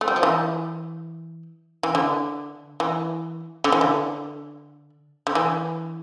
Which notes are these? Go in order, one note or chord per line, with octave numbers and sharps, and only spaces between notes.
A3
G3
F3
E3
E3
D3
E3
D3
E3
D3
D3
E3